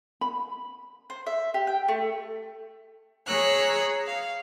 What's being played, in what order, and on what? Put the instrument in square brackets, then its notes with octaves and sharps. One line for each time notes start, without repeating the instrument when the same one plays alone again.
[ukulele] B5
[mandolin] C5
E5
G4
G5
A3
[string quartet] G#4 C#5 A#5 E6 F#6
F5